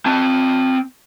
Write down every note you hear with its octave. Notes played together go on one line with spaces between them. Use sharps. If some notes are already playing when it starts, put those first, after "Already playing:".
C4 A5